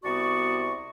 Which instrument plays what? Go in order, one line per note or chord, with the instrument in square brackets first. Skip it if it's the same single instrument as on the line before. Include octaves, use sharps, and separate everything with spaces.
[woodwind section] C2 B3 F#4 D5 C#6